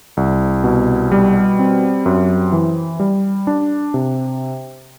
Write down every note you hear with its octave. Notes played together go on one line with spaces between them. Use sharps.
C2
B2
G3
C4
F#2
E3
G3
D4
C3